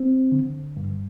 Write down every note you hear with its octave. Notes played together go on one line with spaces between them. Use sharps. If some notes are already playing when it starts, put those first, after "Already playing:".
Already playing: C4
D3
G2